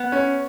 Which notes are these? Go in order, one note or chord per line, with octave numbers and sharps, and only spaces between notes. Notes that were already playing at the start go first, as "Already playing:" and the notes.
Already playing: B3
C#4